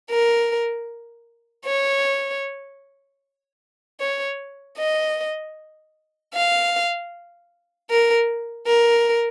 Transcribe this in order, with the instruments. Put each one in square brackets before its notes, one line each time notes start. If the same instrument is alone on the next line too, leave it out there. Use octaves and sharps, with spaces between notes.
[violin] A#4
C#5
C#5
D#5
F5
A#4
A#4